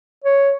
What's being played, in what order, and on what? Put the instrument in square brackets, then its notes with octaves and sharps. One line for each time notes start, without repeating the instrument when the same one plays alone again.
[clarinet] C#5